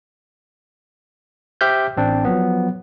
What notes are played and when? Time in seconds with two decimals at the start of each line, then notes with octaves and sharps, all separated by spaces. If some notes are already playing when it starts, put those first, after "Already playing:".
1.61 G4 C5 E5 F6 G6
1.97 A1 C4 D4
2.25 F3 F#3 B3